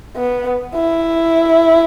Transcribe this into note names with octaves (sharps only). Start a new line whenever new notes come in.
B3
E4